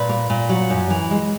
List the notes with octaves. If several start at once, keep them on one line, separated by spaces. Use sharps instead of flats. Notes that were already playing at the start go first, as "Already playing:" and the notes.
Already playing: A#2 B4
A#3
A#2
F#3
F#2
E3
G#3